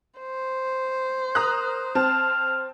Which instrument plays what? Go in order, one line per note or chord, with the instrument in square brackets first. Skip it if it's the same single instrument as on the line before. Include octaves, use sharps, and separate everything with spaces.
[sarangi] C5
[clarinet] A#4 [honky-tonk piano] A#5 D#6 F#6
[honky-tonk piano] C4 A5 [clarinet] F6